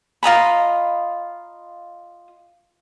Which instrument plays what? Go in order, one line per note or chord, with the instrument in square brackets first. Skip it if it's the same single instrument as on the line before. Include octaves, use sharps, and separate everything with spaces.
[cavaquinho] F4 D#5 A#5 B5